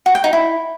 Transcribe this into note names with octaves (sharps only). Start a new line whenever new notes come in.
F#4
G5
D#4
E4